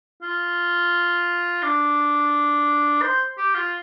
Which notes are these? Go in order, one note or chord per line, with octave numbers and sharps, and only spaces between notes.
F4
D4
C5
G4
F4